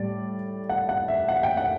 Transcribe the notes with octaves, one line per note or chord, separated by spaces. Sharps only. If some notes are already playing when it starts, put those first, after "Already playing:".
Already playing: A2 G3 D5
F#5
F#5
E5
F#5
G5
F#5